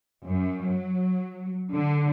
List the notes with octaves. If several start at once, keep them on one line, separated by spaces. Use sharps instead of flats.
F#2
F#3
D3